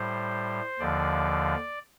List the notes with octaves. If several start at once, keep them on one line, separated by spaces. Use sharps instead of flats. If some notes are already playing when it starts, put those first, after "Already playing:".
Already playing: A2 G3 C5
D#2 D3 F3 D5